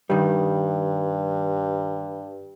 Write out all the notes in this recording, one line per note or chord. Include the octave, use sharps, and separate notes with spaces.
G2 D#3 G3